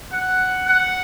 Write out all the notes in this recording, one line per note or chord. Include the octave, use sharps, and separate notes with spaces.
F#5
F#5